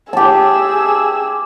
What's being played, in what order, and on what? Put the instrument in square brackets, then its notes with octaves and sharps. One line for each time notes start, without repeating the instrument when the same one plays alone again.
[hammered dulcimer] G4 A5 [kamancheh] G#4 E6